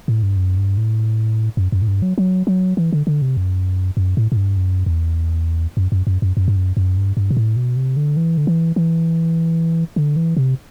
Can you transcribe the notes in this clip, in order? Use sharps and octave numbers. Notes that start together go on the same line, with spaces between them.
A2
G2
F#2
G2
A2
F#2
F#2
A2
G2
F#3
F#3
F#3
E3
D3
D3
C3
F#2
F#2
A2
A2
G2
F#2
E2
F#2
F#2
F#2
F#2
F#2
G2
F#2
F#2
G2
G2
B2
A2
B2
C3
D3
E3
D3
E3
E3
D3
E3
C3